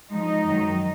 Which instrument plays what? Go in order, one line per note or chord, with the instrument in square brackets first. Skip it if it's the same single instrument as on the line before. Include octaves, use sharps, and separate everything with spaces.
[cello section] G#2 F3 G#3 D#4 D#5
F#2 D#3 F#3